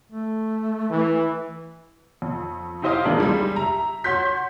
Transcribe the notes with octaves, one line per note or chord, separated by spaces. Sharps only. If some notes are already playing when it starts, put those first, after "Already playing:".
A3
E3
F2
D#4 E4 G4 C5 D#5 F5
A1 D#2 G#3 D4 F4 A#4
G3 G#3
E5 A#5
F#4 C#5 C6 G6 B6